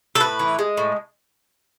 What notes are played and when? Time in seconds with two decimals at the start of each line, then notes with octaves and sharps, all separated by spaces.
0.15 A4
0.20 A2 B4
0.39 E3
0.59 G#3
0.77 A2